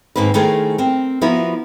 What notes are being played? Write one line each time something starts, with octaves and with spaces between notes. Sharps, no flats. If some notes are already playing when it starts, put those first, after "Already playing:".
G#2 D#3 A#3 C4 B4
D#3 A3 E4 G#4 A#4 C5
C4 A#4
F3 B3 E4 F#4 A#4